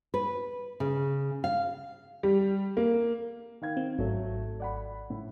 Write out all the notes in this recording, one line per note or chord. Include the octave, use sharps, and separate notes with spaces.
B4
C#3
F5
G3
A#3
D#3 F5 G#6
C4
G#1 F#3 A3
D5 F#5 B5
A2